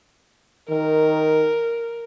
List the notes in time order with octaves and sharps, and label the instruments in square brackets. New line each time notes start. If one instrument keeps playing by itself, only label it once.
[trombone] D#3 [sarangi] A#4